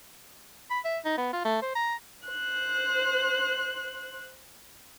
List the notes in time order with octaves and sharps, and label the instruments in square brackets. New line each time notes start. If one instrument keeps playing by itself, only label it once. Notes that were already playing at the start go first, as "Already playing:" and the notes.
[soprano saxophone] B5
E5
D#4
B3
F4
A3
C5
A#5
[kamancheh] C5 F#6